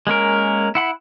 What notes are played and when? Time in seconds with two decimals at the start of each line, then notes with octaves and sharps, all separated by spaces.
0.07 G#3 A#3 C#4 A#4
0.75 E4 F#5 B5